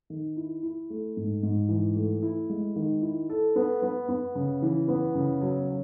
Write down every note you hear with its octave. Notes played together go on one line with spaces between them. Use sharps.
D#3
E4
E4
A3
G#2
G#2
E3
A3
E4
G#3
D#3
E4
A4
B3
B3
B3
C#3
E3
B3
C#3
F#3
F#3